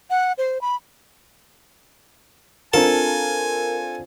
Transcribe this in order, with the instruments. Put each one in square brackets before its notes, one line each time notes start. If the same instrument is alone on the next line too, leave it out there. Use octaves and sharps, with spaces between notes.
[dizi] F#5
C5
B5
[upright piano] C4 D4 F4 [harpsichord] A4 [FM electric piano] A#4 [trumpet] G#5